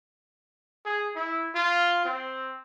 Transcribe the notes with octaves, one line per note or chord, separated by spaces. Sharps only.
G#4
E4
F4
C4